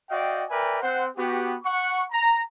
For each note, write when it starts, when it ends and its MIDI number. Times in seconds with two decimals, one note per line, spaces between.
0.10 0.44 66
0.10 0.44 74
0.10 0.44 75
0.10 0.44 77
0.10 0.44 79
0.50 0.80 70
0.50 0.80 71
0.50 0.80 74
0.50 0.80 76
0.50 0.80 79
0.50 0.80 80
0.81 1.06 60
0.81 1.06 72
0.81 1.06 78
1.17 1.56 59
1.17 1.56 66
1.17 1.56 67
1.64 2.03 78
1.64 2.03 85
2.12 2.40 82